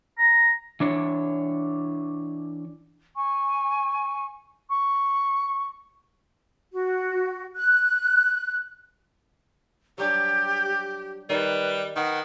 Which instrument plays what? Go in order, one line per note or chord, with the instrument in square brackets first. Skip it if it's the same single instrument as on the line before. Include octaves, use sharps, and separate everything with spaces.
[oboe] A#5
[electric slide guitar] E3 D4 C#5
[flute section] G#5 C#6
C#6
F#4
F#6
[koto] F#3 G3 D4 [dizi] G4
[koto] D#3 [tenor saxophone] G3 [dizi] B4
[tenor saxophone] D#3 [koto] B4 [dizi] F#5